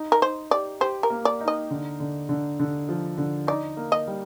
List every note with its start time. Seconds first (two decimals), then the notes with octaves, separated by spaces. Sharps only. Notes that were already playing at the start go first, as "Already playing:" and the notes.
Already playing: D#4
0.12 A#4
0.21 D#4 C5
0.51 G4 D5
0.81 G4 C5
1.03 A#4
1.10 A#3
1.25 D5
1.41 D#4
1.48 D#5
1.70 D3
2.00 D3
2.29 D3
2.60 D3
2.89 F3
3.18 D3
3.47 D#4 D5
3.77 A#3
3.92 D#5
4.07 G3